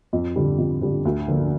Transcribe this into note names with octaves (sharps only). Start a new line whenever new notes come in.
F2
D3 G3
F2
D3 G3
D2
D3 F3 A#3 D4